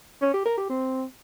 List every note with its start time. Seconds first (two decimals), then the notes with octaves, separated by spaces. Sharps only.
0.22 C#4
0.34 G4
0.46 A#4
0.58 G4
0.70 C4